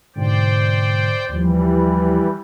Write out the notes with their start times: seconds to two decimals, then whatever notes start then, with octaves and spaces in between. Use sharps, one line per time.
0.16 G#2 B2 D3 C5 D5 G5
1.29 D#2 E3 F3 G3